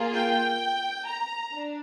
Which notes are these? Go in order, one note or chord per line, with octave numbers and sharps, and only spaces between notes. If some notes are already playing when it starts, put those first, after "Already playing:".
Already playing: A#3 F4 G#4
G5
A#5
D4